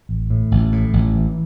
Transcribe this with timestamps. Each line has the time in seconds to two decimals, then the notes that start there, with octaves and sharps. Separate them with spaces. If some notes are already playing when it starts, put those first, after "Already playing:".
0.09 A1
0.30 A2
0.51 A1
0.72 A2
0.93 A1
1.15 E3